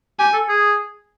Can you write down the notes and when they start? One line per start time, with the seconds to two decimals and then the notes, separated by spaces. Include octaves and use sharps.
0.19 G4 G#5
0.33 A4
0.49 G#4